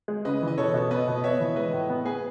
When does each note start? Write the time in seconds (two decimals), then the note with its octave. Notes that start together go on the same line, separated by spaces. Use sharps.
0.08 G#3
0.25 C#3 B4 D#5
0.42 E3
0.48 D#5
0.58 B2 A4 C#5
0.74 B2
0.90 B3 B4 D#5
1.08 B2
1.24 B3 C#5 E5
1.40 E3
1.56 G#3 B4 D#5
1.73 A2
1.89 B3
2.05 B3 G#4 B4